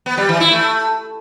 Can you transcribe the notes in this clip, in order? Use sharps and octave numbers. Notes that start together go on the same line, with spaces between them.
B3
G3
E3
E4
A3